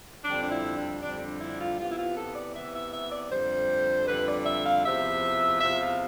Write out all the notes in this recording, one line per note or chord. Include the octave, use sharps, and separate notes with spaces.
F2 D3 G3 C4 D4
D4
E4
D4
F2 D3 G3 C4 D4
D4
E4
F4
C3 E3 B3 F4
E4
F4
A4
D5
C3 E3 B3 E5
E5
E5
D5
F2 D3 G3 C5
F2 D3 G3 B4
D5
E5
F5
E2 C3 F3 E5
E2 C3 F3 E5
F4